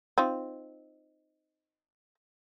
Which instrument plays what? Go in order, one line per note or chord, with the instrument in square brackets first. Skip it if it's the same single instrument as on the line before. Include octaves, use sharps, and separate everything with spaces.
[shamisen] C4 D#4 F4